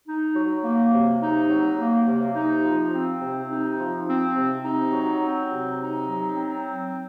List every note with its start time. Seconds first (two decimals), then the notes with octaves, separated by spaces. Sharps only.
0.07 D#4
0.35 F#3
0.64 A#3
0.93 C3
1.21 D#4
1.50 F#3
1.79 A#3
2.07 C3
2.35 D#4
2.64 F3
2.93 C4
3.21 C3
3.50 D#4
3.79 F3
4.07 C4
4.35 C3
4.64 D#4
4.92 F#3
5.22 C4
5.50 C3
5.79 D#4
6.07 F#3
6.36 C4